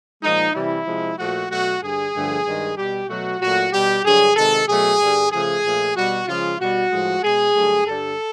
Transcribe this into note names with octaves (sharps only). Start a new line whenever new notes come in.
A#2 F3 G#3 D#4
C3 E3 G3 E4
C3 F3 G#3
A#2 F3 A3 F#4
B2 F#3 A3 F#4
G2 D3 G3 G#4
G2 D3 F3 A3
G2 D#3 G#3
B2 G3 G4
B2 F#3 A3 F#4
A#2 F#3 A3 F#4
B2 G3 G4
G2 D3 F#3 G#4
C3 D#3 G#3 A4
B2 F#3 A3 G#4
G2 D3 G3
C#3 F3 A3 G#4
A#2 F3 A3
B2 G3 F#4
C#3 F3 G#3 F4
B2 G3 F#4
A2 F3 G#3
B2 G#3 G#4
G2 D3 F#3 A3
G2 D3 G3 A4